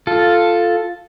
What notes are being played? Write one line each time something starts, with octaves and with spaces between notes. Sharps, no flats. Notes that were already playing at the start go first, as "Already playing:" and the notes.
F4 A4